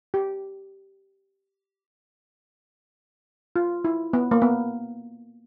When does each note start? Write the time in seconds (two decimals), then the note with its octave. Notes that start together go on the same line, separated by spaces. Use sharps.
0.14 G4
3.56 F4
3.85 E4
4.13 B3
4.31 A#3
4.42 B3